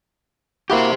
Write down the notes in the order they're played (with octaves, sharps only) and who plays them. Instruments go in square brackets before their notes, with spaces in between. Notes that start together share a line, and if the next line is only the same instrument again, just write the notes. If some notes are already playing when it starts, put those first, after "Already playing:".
[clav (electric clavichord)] A#3 E4 F#4 [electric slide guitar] G4 C5